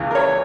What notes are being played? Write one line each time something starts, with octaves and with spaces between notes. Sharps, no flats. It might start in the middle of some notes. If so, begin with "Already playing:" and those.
Already playing: C#2 C#3 E3
A#4
C#5